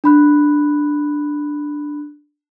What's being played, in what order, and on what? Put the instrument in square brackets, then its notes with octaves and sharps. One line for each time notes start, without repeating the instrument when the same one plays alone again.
[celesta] D4 B5 F#6